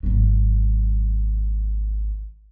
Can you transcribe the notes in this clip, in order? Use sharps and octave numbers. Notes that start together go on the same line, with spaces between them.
G#1 F#3